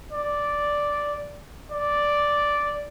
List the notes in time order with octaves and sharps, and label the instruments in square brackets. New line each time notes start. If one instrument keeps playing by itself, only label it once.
[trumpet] D5
D5